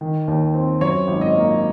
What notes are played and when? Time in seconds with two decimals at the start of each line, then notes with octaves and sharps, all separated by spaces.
0.01 D#3
0.28 D#2
0.54 C4
0.81 F#2 C#5
1.08 G#1
1.21 D#5
1.35 A#3